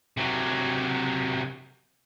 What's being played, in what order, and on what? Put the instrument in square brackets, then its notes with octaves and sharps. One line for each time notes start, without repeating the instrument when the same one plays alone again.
[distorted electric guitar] C3 F#3